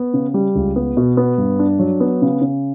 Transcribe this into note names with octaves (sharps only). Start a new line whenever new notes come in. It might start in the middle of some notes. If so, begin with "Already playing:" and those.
Already playing: B3
C#3
G3
C#2
B3
B2
B3
G2
D4
F#3
B3
C#3
C#3